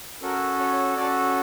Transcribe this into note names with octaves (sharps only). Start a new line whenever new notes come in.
C#4 F#4 A4 A#4
C#5
C#4 F#4 A4 D5